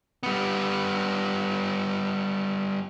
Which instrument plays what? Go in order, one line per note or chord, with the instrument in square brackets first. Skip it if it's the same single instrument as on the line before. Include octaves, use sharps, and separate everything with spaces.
[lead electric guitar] G3 B3